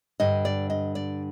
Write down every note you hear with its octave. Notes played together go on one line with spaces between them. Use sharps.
G2 D3 D#5
D5
D#5
D5